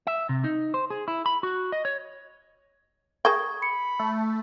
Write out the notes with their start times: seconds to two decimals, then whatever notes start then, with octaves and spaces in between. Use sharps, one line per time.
0.07 E5
0.29 C3
0.44 D#4
0.74 C5
0.90 G#4
1.08 E4
1.26 B5
1.43 F#4
1.72 D#5
1.85 C#5
3.25 G#4 A#4 G5 C#6 D#6 G#6
3.62 B5 C#7
3.99 A3